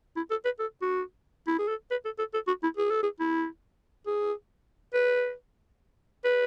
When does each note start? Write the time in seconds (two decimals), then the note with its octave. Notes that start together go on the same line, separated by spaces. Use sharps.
0.16 E4
0.30 A4
0.45 B4
0.59 A4
0.82 F#4
1.47 E4
1.59 G#4
1.68 A4
1.91 B4
2.05 A4
2.19 A4
2.34 A4
2.48 F#4
2.63 E4
2.77 G#4
2.90 A4
3.03 G#4
3.20 E4
4.07 G#4
4.94 B4
6.24 B4